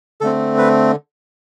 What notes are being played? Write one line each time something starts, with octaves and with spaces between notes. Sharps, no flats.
D3 A3 C4 A4
B4